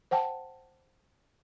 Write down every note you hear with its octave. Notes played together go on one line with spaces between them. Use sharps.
C5 F#5 G5 A5